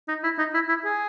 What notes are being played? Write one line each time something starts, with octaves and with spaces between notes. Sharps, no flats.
D#4
E4
D#4
E4
E4
G#4